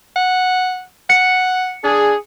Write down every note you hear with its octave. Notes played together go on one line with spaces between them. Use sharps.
F#5
F#5 C#7
D4 G#4